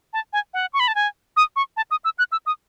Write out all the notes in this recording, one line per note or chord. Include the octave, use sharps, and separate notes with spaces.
A5
G#5
F#5
C#6
B5
A5
G#5
D#6
C#6
A5
D#6
E6
F#6
E6
D#6